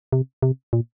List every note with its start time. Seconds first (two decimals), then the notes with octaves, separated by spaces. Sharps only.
0.12 C3
0.42 C3
0.73 A#2